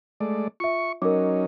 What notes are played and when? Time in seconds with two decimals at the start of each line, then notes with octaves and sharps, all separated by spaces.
0.21 G#3 A3 D5
0.60 F4 E5 C#6
1.02 F#3 C#4 D#4 A#4 D#5 D6